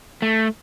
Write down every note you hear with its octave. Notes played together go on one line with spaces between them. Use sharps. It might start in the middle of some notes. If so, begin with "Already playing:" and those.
A3